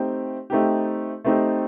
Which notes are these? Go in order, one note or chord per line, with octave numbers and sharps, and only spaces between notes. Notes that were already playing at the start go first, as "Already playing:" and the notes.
Already playing: A3 C4 D#4 G4
A3 C4 D#4 G4
A3 C4 D#4 G4